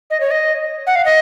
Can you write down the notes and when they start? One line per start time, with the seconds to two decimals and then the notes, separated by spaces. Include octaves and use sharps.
0.10 D#5
0.20 C#5
0.31 D#5
0.87 F#5
0.95 F5
1.05 D#5